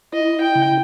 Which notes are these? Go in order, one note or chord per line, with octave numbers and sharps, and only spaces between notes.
E4 D#5
G5
C#3